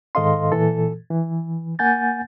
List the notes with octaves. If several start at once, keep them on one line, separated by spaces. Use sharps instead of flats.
G#2 D#3 A4 D#5 F5 C6
A#2 E3 A4
E3
A#3 F#5 G#5 G6 A6